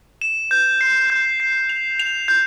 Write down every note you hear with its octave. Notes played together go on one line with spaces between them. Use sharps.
E7
G6
C7
G6
C7
F7
F7
G6